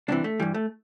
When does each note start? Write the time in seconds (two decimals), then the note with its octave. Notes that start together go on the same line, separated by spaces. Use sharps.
0.08 C2 C3 E3 D4
0.24 A3
0.40 G2 E3 G3
0.54 A3